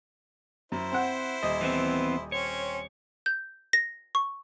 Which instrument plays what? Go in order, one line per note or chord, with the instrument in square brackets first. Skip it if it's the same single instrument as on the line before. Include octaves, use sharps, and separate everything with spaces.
[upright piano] F#2 [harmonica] E4 C5
[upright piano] C4 F#5
D#1 D#5
[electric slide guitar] E3 B3 C4
[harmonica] C4 C#4 [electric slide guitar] C#5
[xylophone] G6
A#6
C#6